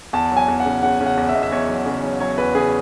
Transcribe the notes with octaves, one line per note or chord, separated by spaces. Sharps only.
E2 A5
F#3
G#5
E2
F#5
C#3
C#3 F#5
C#3
F#5
E2
E5
E2 D#5
E5
E2 C#5
F#3
C#3
F#3
F#3 C#5
E2 B4
C#3 G#4